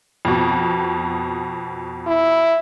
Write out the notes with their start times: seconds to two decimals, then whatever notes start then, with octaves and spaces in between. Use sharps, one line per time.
0.25 F2 B2
2.07 E4